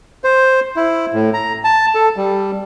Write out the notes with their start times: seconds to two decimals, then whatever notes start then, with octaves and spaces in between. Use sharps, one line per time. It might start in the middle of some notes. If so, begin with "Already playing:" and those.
0.24 C5
0.76 E4
1.14 A2
1.34 A#5
1.64 A5
1.95 A4
2.17 G3